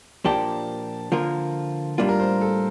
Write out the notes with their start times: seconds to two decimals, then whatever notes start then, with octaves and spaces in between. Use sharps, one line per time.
0.25 A#2 F3 A#3 D4 G4 A5
1.12 D3 F3 A#3 F4 A#4
1.98 A2 G3 A#3 D4 F4
2.09 A#4
2.20 C5
2.41 A4